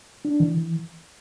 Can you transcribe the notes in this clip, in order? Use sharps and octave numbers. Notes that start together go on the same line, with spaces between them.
D4
E3
E3